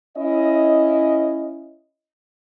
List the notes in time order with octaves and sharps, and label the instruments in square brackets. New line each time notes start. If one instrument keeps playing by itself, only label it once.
[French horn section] C#4 E4 D#5